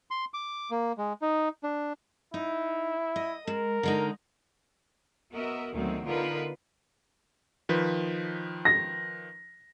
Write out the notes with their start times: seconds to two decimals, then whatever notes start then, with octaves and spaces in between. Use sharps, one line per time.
0.11 C6
0.34 D6
0.71 A#3
0.98 G#3
1.22 D#4
1.64 D4
2.34 D#4 E4
3.16 D#5
3.47 G#3 A#4
3.83 D3 G#3 D#4
5.33 B3 F#4 A#4 D#5 E5
5.73 D2 B2 D#3 F#3 G#3 C4
6.05 D3 B3 D#4 F4 A#4 B4
7.69 D#3 F3 B4
8.65 A#6